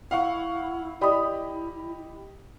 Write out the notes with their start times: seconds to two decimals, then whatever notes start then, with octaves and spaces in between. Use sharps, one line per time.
0.11 E4 F5 F#5 C#6
1.01 E4 G4 D5 D#5 B5 D#6